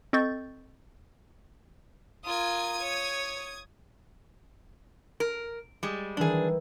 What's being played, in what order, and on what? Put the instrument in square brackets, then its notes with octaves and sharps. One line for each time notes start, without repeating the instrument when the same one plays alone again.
[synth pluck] C4 A4 D#5 C#6 G6 A6
[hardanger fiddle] F4 A#4 [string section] D#6 G#6
[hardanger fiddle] C#5
[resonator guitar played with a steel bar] A#4
G3 G#3
[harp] D#3 E3 G3 [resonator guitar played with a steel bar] D4 G#4